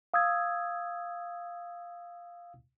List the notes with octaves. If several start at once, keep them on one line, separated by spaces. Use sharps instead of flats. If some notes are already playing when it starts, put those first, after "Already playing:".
F5 D#6 E6 G#6